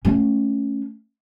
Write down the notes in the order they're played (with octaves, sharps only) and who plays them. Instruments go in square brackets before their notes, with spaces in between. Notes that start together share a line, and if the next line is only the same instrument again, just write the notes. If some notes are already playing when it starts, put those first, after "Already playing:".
[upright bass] A3 C#4